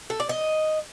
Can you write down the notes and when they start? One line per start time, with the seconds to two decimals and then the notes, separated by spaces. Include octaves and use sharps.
0.10 A4
0.20 D5
0.29 D#5